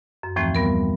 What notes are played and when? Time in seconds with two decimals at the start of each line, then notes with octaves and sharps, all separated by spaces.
0.23 F#2
0.36 D#2 A2 E3 F3 A3 C4
0.55 G3 B3 A#4